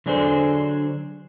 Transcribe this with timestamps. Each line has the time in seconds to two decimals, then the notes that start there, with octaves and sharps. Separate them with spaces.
0.06 D3 F#3 D4 G#4 A4 C5